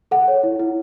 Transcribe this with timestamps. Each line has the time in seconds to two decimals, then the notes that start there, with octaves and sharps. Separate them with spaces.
0.11 A4 F#5
0.28 C#5
0.43 E4
0.60 E4